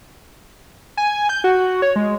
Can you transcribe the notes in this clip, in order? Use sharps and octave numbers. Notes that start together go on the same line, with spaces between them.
G#5
G6
F#4
C#5
G#3